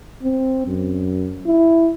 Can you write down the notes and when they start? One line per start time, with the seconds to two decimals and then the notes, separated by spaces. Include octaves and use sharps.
0.23 C4
0.67 F#2
1.47 E4